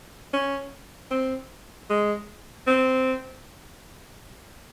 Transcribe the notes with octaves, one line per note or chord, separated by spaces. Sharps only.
C#4
C4
G#3
C4